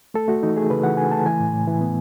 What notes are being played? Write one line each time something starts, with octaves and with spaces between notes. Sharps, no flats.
A3 A4
A3 F#4
E3 D#4
A3 G#4
C#3 B4
E3 F#5
C#3 G#5
A3 A5
E3 G#5
A2
A2
E3
B3